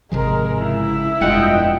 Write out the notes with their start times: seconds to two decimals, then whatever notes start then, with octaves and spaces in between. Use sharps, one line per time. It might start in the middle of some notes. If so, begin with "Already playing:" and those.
0.12 G#1 C3 F3 G#3 A#4
0.61 C#2 E4 E5
1.21 F1 G2 B2 G#3 F4 D#5 F#5 G5